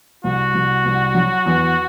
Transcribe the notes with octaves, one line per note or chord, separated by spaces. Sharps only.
C2 F#4
C2
C2
F#3
E2